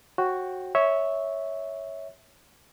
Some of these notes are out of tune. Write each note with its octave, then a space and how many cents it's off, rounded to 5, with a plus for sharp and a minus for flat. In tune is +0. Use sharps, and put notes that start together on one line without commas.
F#4 +0 C#5 -45 G5 +0
C#5 +0 E5 -15